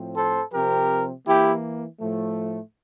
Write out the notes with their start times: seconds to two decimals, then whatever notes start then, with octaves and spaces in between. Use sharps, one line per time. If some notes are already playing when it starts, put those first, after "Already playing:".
Already playing: A2 F3 C4
0.16 A4 C5
0.53 C3 F3 C4 G4 A#4
1.26 E3 A#3 E4 G4
2.00 A2 F3 A3